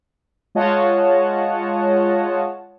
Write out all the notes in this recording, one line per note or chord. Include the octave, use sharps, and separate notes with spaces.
G#3 F4 C#5 D#5 F#5 A5